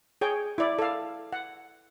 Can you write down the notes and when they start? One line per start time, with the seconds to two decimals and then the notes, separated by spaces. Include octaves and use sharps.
0.21 G#4 C#5 G5
0.58 E4 D5
0.79 A4 F5
1.33 F#5